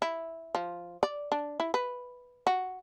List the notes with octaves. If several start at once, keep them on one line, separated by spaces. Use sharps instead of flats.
E4
F3
D5
D4
E4
B4
F#4